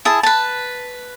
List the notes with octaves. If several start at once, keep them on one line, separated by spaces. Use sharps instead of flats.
E4 G#4 A5
B4 A5